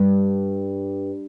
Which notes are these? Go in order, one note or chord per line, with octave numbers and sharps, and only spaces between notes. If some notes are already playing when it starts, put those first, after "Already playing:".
Already playing: G2